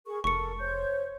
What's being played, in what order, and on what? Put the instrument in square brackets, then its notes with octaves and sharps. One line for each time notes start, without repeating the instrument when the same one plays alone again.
[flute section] G#4 A#4 C#6
[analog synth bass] F1 [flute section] A4 A#4 [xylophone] C#6 C#7
[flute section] C5 C#5 G6